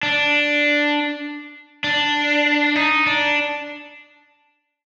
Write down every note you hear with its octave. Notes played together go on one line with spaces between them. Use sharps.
D4
D4
D#4
D4